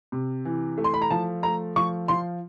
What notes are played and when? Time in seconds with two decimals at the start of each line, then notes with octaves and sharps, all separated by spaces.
0.12 C3
0.45 E3
0.78 A3
0.84 C6
0.94 B5
1.02 A#5
1.10 F3 A5
1.43 A3 A#5
1.76 F3 C#6
2.08 F3 C6